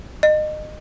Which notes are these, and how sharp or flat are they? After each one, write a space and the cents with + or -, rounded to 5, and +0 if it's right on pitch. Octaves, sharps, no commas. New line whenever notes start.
D#5 -25